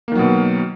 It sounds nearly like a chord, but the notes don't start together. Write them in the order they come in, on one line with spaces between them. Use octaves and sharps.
A#3 D#3 F#3 B2